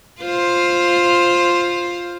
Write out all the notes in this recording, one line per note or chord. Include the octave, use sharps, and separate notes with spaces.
F4 C5